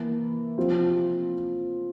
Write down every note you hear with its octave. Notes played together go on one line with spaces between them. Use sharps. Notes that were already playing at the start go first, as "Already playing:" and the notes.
Already playing: E3 A#3 E4 A#4
F3 C4 F4 C5